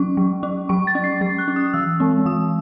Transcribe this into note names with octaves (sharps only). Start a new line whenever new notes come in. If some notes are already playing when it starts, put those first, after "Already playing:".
Already playing: F#3 C#4 C#6
F#3
C#4
F#3 C#6
A6
C#4
C7
F#3 A6
F#6
C#4
D#6
E3 E6
G#3 C4
E3 D#6